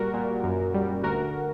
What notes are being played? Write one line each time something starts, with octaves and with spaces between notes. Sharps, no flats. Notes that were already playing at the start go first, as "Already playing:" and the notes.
Already playing: A#2 G3 F#4 A#4
A#2
F#2
G3
D2 F#4 A#4